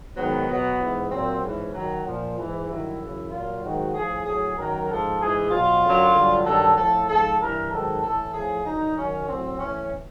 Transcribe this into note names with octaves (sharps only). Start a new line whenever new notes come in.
G#2 D#3 F#3 B3
B2 F#3
G#2 E3
A#2 F#3 C4
G#2 E3 C#4
F#2 D#3 F#3
A#2 F3
G#2 E3
G2 D#3 F#3 E4
F#2 C#3 E3
A#2 F#3 F4
G#2 D#3 F#3 F#4
A2 F3 G#4
A2 F#3 G#4
F#2 D#3 F#3 A#4
G#2 F3 A4
G#2 E3 G#4
B2 F#3 F4
F#2 D3 F#3
G2 D3 F#3
G2 D#3 F#3 A4
A2 F3 A4
G#2 F3 A4
G2 E3 A#4
G#2 D#3 F#3 A4
A2 E3 A4
A2 F3 G#4
F#2 D3 F#3 D#4
F#2 D#3 F#3 C#4
A2 F#3 C4
A2 E3 C#4